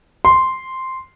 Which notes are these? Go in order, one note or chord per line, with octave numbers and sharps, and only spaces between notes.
C6